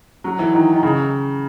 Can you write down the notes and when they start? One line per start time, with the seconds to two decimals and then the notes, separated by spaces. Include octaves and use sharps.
0.24 F#3
0.39 E3
0.54 D#3
0.73 D#3
0.83 C#3